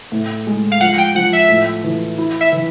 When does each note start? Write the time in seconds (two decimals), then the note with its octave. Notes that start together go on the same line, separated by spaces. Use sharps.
0.12 A2
0.47 G#3
0.72 F5
0.81 F3 F#5
0.98 G5
1.15 F3 F#5
1.33 E5
1.49 A2
1.84 E3
2.18 E4
2.41 E5
2.52 E3